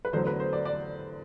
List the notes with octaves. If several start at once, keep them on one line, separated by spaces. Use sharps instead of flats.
B4
E2 D3 F#3 A3 C5
B4
C5
D5
D5